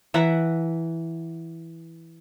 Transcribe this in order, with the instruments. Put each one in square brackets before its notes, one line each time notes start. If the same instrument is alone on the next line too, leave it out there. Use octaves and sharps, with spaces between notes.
[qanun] E3 E5 F#5 A#5